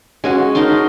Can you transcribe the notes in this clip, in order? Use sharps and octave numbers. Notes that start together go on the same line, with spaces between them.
G#3 C#4 F#4
D#4 A#4 A5 C6